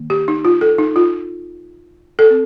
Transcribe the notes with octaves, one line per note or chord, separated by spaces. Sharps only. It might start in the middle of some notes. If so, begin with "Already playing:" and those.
Already playing: D#3 A#3
G4
D#4
F4
A4
D#4
F4
A4
C4